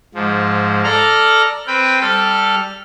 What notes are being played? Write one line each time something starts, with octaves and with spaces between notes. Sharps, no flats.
G#2 F3
A4 D5 A#5 F6
C4 B4 G5 B5
G3 A4 F6